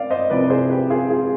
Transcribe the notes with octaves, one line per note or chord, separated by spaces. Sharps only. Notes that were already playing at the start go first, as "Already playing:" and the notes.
Already playing: C3 D5 F5
C5 D#5
C2 C3 F3 B4 D5
G#4 C5
G4 B4
F4 G#4
F4 G#4